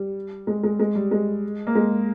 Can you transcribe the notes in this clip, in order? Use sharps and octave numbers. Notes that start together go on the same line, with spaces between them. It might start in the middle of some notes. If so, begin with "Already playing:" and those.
Already playing: G3
G#3
G#3
G#3
G3
G#3
A#3
G#3